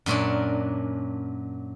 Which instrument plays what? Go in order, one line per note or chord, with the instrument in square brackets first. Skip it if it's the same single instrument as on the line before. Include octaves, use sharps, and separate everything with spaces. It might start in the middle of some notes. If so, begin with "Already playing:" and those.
[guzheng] F#2 A#2 C#4 D4